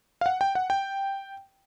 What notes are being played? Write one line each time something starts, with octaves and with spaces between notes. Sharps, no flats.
F5
F#5
G5
F#5
G5